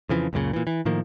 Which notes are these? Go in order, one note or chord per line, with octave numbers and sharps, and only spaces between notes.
F2 C#3 E3 F3
C#2 F#2 A#2 C#3
A#2 E3
E3
A2 D#3 F3 A#3